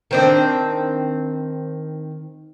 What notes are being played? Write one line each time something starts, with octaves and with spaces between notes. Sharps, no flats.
D#3 C4 D4